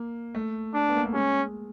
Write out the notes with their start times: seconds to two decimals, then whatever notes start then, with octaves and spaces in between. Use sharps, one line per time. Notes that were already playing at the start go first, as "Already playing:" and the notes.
Already playing: A#3
0.35 A3
0.74 D4
0.89 B3
0.96 A#3
1.06 A3
1.14 G#3 C#4